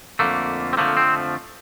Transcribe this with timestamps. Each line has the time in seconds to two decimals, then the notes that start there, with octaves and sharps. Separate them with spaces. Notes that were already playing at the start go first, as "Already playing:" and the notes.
0.19 F2 D3 A3 A#3
0.73 C4
0.77 F2 D3 F3 A3 A#3
0.97 C4